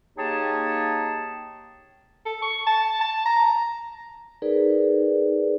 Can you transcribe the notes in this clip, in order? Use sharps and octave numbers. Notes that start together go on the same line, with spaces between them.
A#3 D#4 G4 G#4 C#5 A5
A4
C#6
A5
A5
A#5
D#4 G#4 A#4 B4 D5